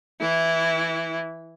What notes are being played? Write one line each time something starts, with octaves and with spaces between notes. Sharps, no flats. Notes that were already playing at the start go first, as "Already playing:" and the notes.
E3 E4